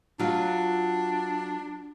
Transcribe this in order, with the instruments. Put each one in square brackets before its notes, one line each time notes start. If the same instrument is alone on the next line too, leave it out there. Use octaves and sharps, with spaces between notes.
[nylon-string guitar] F#3 F4 [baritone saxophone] D4